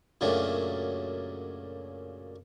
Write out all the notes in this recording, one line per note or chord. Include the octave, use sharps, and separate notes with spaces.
F#2 A#2 C#3 F#3 A3 D4